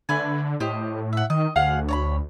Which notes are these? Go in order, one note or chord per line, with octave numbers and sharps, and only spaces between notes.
D3 A3 B4 G#5
A2 G4 C5 D#5
E5 F#5
D#3 D#5
D2 G#4 F5 F#5
C#5 A#5 B5